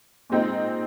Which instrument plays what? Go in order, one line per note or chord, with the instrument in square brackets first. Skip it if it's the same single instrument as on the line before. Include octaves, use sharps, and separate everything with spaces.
[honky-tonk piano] A#2 G#3 C4 D#4